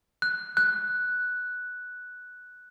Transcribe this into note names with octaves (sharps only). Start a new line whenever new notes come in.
F#6
F#6